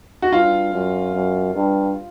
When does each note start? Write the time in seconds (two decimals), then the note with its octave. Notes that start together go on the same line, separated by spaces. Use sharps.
0.22 F#4
0.32 G2 F4
0.73 F#2
1.14 F#2
1.54 G2